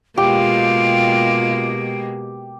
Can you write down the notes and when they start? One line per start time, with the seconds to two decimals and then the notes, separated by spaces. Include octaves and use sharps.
0.18 B2 G#3 A#3 F4 G4 D7